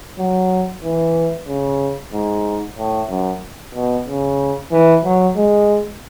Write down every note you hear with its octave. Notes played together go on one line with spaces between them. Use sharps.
F#3
E3
C#3
G#2
A2
F#2
B2
C#3
E3
F#3
G#3